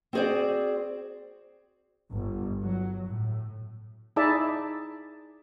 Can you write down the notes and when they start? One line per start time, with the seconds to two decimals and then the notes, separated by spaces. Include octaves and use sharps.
0.13 C4 F#4 G#4 C5 D5
2.12 G1
2.62 F#3
3.08 A2
4.16 D#4 E4 G#4 D5 E5 A5